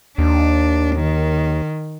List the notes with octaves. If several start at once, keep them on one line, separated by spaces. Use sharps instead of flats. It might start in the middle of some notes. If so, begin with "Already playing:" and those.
D#2 D4
D#3